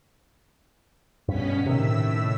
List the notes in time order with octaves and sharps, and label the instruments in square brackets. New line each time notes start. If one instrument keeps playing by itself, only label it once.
[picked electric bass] G2 [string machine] B2 C#4 B6
[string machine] A2 E6 B6 [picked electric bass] C3 D#3